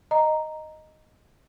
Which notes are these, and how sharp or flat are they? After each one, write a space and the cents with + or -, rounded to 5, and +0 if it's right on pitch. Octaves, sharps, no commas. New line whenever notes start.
D#5 +0 A#5 +0